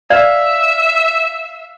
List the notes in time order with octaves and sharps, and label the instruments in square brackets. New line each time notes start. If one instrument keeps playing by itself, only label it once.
[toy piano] D5 [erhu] E5 [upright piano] F5